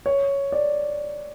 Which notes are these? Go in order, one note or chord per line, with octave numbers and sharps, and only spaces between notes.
C#5
D5